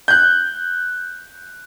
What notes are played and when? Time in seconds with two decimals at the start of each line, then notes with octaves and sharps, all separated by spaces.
0.08 F#6 G6